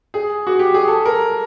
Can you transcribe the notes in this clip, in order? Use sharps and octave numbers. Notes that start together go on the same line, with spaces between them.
G#4
F#4
G4
G#4
A4
A#4